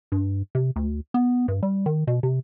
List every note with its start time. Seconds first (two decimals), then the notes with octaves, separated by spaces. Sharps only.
0.12 G2
0.55 C3
0.76 D2
1.14 B3
1.48 G2
1.63 G3
1.86 D#3
2.07 B2
2.23 C3